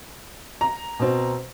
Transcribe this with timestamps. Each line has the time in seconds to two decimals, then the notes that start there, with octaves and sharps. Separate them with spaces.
0.61 A#5
0.99 B2 C4